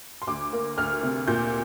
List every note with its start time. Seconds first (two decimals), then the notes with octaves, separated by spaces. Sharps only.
0.22 C6
0.27 D2 D6
0.53 A#3
0.78 D2 F6
1.03 C3
1.28 A#2 G6